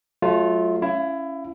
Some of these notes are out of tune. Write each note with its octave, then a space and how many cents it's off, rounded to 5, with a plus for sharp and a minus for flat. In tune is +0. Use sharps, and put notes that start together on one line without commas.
F#3 +0 A3 -30 F4 +0
C#4 +0 E4 +20 F5 +0